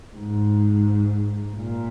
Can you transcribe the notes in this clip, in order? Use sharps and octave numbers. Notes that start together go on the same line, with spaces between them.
G#2
A#2